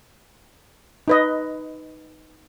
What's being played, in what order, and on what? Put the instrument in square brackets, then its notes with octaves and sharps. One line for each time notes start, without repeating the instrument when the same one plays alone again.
[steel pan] D#4 B4 D#5